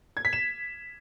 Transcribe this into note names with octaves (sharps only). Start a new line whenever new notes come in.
G#6
B6
E7